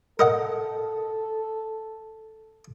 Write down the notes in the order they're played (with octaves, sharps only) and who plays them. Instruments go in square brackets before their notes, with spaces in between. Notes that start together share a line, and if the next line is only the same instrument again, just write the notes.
[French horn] A4 [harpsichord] A#4 D#5 F#5